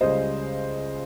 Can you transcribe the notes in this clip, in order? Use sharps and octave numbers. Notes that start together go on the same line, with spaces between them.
C#2 C#3 G3 C5 D#5